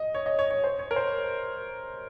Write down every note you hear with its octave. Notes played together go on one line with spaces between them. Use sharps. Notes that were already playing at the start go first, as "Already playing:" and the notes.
Already playing: D#5
C#5
D#5
C#5
C#5
C5
C#5
A#4
C5